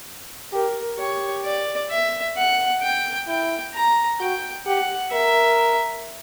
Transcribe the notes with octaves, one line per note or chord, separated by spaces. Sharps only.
G4 A#4
G4 C#5
D5
E5
F#5
G5
E4 G5
A#5
F#4 G5
G4 F#5
A#4 E5